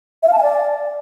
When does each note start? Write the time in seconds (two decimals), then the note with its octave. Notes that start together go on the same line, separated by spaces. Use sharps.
0.23 E5
0.28 F5
0.33 A5
0.38 G#5
0.43 D5